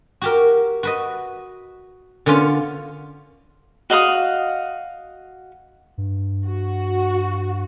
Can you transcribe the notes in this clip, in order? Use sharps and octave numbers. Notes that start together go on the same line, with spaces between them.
F#4 G4 A#4
F#4 B4 D#5
D3 B3 C#4 F4
F#4 D#5 F5 D#6
G2
F#4